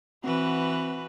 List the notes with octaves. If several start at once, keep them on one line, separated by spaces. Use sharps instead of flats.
E3 C4 F#4 B4